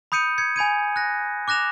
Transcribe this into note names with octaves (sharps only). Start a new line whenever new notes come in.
B5 D#6 G6 C#7 D#7
G#6 C#7
G#5 B5 G#6 D#7
F#6 A#6
D6 F#6 A#6 E7 F7